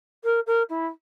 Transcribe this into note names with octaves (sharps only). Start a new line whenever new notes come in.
A#4
A#4
E4